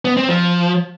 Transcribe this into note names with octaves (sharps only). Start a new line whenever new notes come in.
B3
C4
F3